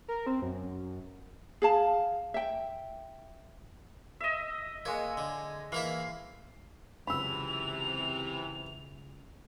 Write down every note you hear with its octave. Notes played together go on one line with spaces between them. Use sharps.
A#4
C4
F#2
G#4 F5 A5
E5 G5
D#5 E5
G#3 A#3 C#5
D3
E3 A#3 E4 F5
C#2 C3 E3 F#3 B5 C6 E6 F7